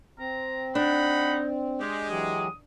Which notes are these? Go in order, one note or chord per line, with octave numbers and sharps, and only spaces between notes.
C4 A#5
D4 D#4 F#5 B5
G#3 G4
E3 F#3 G4 D#6